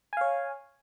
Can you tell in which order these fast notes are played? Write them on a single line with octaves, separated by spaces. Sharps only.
G#5 F5 C#5